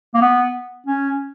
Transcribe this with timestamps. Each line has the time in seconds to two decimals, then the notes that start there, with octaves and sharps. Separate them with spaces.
0.14 A#3
0.21 B3
0.86 C#4